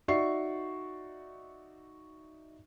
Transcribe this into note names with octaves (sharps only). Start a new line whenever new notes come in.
D#4 F#4 D5 E5 C#6 C7